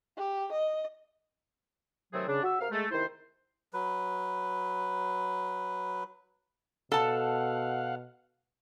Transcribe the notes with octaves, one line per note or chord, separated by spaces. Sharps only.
G4
D#5
C3 D#3 F#3 A3 C4 G#4
C#3 D4
F#4 E5
C3 A#4 F5 F6
G#3 A3
C3 D#3 E4 C5
F#3 B4
B2 A4 F5 F#5 A5